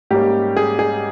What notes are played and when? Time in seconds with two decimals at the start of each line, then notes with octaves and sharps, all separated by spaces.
0.10 G#2 G3 A#3 C#4 G4
0.57 G#4
0.79 G#4